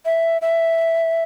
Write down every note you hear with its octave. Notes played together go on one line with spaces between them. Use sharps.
E5
E5